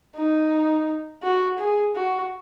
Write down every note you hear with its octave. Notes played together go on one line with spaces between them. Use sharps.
D#4
F#4
G#4
F#4